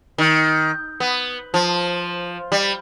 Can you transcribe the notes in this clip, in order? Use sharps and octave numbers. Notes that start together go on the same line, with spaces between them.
D#3
B3
F3
G3